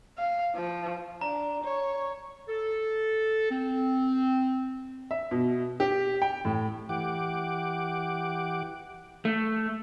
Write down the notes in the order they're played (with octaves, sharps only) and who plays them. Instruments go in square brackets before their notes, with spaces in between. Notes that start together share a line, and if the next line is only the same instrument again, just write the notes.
[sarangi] F5
F3
[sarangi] D4 [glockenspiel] A#5
[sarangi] C#5
[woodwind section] A4
C4
[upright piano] E5
B2
G4
G5
A2
[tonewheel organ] E3 G4 F#5 D6
[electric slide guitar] A3